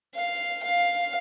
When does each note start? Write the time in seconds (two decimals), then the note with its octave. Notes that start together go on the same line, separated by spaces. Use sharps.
0.15 F5
0.63 F5